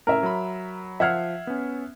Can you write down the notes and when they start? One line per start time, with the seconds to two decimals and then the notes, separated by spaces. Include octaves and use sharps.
0.07 A2 C#4 A#4 E5
0.23 F#3 B5
1.00 F3 E5 F#5 F6 G#6 C7
1.47 B3 C#4